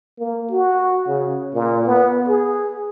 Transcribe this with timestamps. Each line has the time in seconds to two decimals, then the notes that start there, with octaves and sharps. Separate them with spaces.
0.19 A#3
0.50 F#4
1.07 C#3
1.54 A#2
1.86 B3
2.27 G#4